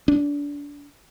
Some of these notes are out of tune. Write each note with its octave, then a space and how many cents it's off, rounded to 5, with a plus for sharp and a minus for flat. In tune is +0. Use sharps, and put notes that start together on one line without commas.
D4 -25